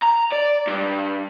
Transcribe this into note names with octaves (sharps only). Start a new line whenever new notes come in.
A#5
D5
G2